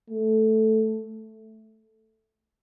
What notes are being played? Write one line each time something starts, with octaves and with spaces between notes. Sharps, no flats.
A3